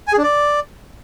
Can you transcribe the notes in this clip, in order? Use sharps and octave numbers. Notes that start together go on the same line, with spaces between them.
G#5
G#4
D4
D5